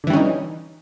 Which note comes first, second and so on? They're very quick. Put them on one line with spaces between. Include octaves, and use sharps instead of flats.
D3 E3 G3 C#4 D#4